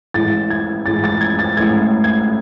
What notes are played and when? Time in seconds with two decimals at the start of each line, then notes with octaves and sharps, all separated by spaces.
0.14 A1 A2 G#3 A6
0.50 G#6
0.86 A1 A2 G#3 A6
1.04 A6
1.21 G#6
1.39 A6
1.57 A1 A2 G#3 G#6
2.04 G#6